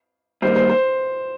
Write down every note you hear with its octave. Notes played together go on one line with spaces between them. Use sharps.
G2 D#3 G3 A#3 C5
C5
C5